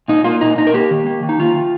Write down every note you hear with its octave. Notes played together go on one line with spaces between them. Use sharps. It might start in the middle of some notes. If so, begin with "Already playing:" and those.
A#2 D#4
A#3 F4
A#2 D#4
A#2 D#4
A#4
A#3 G4
D#3
A#3
D#3
D#4
D#3 F4
D#3